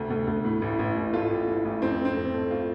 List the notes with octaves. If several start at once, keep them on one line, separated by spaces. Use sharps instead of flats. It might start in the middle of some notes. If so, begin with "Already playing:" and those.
Already playing: D2 C3 A3
D2
D2
A2
A1
A1
A1
A3 F4
A1
A2
A1
F2 C4
A3
C4
F2
A3
F4